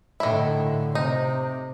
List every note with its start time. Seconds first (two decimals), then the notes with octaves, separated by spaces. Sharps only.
0.20 A2 D3 D#3 E4
0.95 C3 D#4